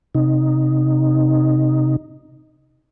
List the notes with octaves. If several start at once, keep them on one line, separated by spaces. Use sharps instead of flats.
C3 D#4